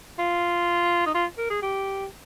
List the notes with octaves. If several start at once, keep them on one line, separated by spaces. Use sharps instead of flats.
F4
D#4
F4
A#4
G#4
G4